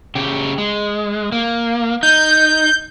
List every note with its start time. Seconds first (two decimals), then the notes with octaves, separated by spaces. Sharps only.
0.15 C#3 G4
0.58 G#3
1.32 A#3
2.03 D#4 G6